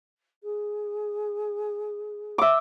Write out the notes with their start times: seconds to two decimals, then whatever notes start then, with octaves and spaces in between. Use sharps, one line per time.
0.43 G#4
2.38 E5 D6